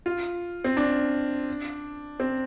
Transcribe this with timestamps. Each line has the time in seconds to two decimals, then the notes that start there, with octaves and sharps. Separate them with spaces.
0.06 F4
0.64 C4
0.77 D4
2.20 C4